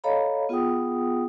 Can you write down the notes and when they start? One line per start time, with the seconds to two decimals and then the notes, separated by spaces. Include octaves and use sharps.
0.04 A4 C#5 D#5 F5 A#5 B5
0.49 B3 F4 G#4 F#5 G5 D#6